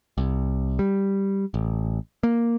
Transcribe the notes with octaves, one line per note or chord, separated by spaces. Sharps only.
C2
G3
A1
A#3